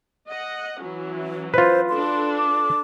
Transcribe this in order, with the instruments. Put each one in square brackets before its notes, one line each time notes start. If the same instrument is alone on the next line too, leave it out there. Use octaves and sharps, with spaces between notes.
[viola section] D#5 F#5
E3 F#3 C#4
[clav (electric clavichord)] F4 B4 [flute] C5
[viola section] D4 A4 [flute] C6
[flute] D6